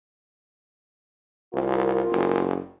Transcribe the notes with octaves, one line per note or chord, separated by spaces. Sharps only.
C2 F4 A#4
F#1